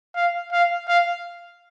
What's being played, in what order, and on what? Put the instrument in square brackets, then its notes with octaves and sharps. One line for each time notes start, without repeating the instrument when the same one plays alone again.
[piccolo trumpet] F5
F5
F5